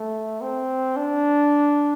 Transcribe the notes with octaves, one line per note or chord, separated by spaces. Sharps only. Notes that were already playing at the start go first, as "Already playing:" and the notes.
Already playing: A3
C4
D4